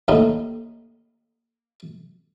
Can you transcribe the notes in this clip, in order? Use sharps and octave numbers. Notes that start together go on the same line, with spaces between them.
D#2 A2 D#4 E4